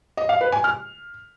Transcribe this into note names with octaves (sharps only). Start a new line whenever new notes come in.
D#5
F5
B4
G#5
F6